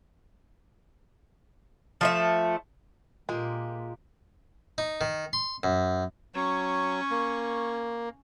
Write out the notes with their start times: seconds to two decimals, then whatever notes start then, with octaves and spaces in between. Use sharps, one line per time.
2.01 F3 A3 E5
3.29 A#2 G#3 A#3 F4 G4
4.78 D#4
5.01 D#3
5.33 C6
5.63 F#2
6.35 F#3 C#4 C#6
7.10 A#3